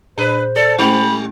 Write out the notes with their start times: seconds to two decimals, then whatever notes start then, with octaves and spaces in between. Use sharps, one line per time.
0.18 A#2 D4 B4 C5
0.56 A4 D5
0.78 G3 A3 C#4 E4 B5